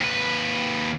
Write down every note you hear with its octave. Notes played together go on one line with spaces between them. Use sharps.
D#2 B4